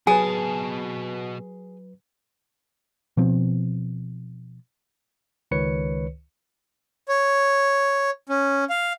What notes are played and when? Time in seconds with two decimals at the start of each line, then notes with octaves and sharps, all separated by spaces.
0.07 B2 F#3 G#4 B4 G#5 A5
3.17 B2 F3 C4
5.51 C#2 D#3 B4 C#5 C#7
7.08 C#5
8.29 C#4
8.70 F5